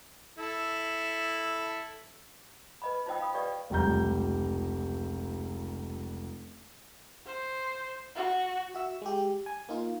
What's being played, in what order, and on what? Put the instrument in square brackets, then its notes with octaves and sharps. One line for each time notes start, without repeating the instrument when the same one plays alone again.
[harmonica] E4 A4
[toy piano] B4 D#5 B5
D#4 F4 C5 D#5 G5 E6
F5 B5 D#6
G4 B4 D5 D#5 F5 G5
[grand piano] F1 C#2 G3 A#5 G6
[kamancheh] C5
F#4
[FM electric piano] F#4 E5 E6
G#3 G4
G#5
A#3 D#4 F4